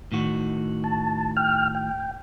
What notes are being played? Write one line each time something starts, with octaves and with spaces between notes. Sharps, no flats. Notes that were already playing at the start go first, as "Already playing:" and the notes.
A2 D#3 F#4
A5
G5 F6
G5